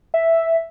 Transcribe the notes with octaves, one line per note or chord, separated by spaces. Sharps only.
E5